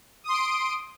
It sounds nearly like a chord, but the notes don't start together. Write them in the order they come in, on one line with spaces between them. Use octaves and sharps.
D#6 C6 D7